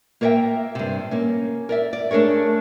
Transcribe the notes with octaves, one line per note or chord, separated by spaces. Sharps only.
A#3 A#4 C#5 D#5 E5 G5
G2 C3
A#3 C#4
A#4 D5 E5
D5
A3 D4 G#4 A#4 C#5